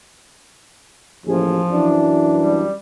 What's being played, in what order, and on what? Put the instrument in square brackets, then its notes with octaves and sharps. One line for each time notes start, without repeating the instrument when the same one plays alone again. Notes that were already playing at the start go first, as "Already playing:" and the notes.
[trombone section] A1 D#2 G#4 [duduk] F3
[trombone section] F#2 E3 D4
[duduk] G3